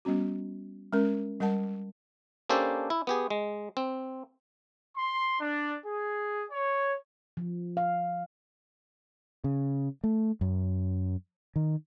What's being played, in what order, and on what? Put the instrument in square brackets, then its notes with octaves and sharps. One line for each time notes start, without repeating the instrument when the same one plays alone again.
[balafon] G3 B3 C#4 F#4
G#3 C#4 A#4
G3 A#4 F#5 A5
[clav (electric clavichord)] A#3 C#4 D4 G4 A4 C5
E4
B3 G4 G#4
G#3
C4
[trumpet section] C6
D4
G#4
C#5
[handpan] F3
F5
[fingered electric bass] C#3
A3
F#2
D#3